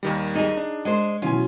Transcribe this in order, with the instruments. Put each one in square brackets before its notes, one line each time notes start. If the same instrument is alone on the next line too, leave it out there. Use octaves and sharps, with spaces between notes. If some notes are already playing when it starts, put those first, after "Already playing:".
[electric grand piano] D#2 D#3 G3
[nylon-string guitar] D#4 G#4
[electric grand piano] D4
[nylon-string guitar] G#3 C5
[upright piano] B2 E3 F#3 [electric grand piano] C#4 G#5 [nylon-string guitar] F4